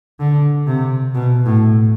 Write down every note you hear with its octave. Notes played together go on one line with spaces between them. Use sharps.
D3
C3
B2
A2